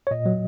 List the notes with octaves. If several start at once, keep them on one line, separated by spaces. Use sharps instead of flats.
C#5
A#2 D#5
F#3